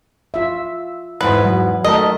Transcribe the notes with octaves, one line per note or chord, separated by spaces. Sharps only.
F4 E5
E2 G#2 B4 C5
F#3
D#3 A3 A#4 D#5 A5